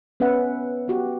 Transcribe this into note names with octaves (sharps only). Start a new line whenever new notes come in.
B3 C#4 B4 E5 F#5
B3 F#4 G4